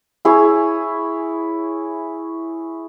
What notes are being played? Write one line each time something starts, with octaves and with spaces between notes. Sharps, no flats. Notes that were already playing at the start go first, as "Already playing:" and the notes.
E4 G#4 C#5